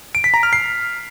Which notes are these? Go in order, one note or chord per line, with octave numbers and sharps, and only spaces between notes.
D7
B6
A#5
F6
C7